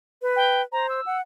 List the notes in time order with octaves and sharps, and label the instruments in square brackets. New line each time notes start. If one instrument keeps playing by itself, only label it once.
[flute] B4
[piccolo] G5
[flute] C5 [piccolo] A#5
[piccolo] E6
[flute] F#5